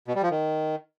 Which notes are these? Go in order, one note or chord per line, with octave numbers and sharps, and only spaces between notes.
B2
G3
F3
D#3